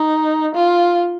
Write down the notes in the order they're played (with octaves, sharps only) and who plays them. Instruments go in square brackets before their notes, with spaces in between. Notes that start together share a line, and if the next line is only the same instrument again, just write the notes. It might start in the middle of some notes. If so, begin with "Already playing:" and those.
Already playing: [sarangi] D#4
F4